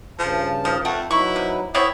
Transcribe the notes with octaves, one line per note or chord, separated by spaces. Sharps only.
G2 C#3 F3 A5
D#3 F3
F2 A3 F#5 G5
F#3 D#4 E4 B4 C#6
C3
B3 C4 E4 C#5